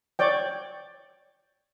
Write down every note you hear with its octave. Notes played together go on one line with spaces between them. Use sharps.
C#5 D5 G5